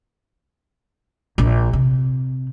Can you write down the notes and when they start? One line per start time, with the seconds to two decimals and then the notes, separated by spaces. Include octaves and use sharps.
1.38 A#1
1.73 C3